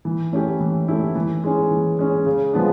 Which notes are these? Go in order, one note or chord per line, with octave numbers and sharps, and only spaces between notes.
E3
A3 C#4 E4 G4
E3
A3 C#4 E4 G4
E3
G#3 C#4
E3
G#3 C#4
C#3
F3 G#3 B3 D4